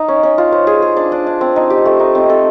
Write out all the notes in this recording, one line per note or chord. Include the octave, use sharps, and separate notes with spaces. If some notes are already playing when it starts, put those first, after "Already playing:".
Already playing: D#4
C#4
C#4
F4
C5
G#4
G#4
D4
D4
D4
C4
D#4
G4
A3
D#4
C4
A4